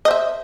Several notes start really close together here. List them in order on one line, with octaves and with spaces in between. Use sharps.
D#5 C5 E5